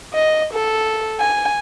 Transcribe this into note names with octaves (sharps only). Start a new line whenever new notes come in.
D#5
A4
G#5